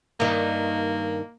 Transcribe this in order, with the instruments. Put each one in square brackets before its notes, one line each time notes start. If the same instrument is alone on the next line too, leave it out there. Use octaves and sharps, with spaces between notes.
[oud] G2 D#3 [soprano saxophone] A#3